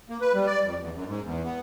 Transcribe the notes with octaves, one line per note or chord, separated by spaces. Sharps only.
A#3
B4
G3
D5
F2
E2
F#2
G#2
E2
B3